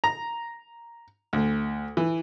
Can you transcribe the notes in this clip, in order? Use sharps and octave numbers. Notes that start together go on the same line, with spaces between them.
A#5
D2
E3